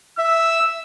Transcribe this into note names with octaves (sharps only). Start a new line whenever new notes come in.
E5 E6